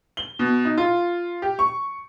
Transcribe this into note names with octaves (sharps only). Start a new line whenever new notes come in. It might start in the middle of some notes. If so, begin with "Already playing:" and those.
G7
B2
D#4
F4
G4
C#6